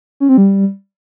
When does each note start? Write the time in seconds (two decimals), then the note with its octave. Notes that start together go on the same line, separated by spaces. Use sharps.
0.20 C#4
0.29 C4
0.37 G3